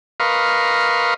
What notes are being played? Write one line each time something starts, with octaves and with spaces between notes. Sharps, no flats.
A#4 B4 D#5 F5 C6 C#6